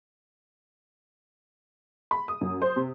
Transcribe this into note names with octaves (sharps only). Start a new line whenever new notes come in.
B5
D#6
F#2
C5
C3